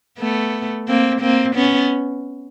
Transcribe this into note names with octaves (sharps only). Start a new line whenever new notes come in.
A3 B3
A#3 C4
A#3 C4
B3 C#4